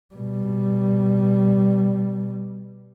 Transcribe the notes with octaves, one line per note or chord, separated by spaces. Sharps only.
B2 G3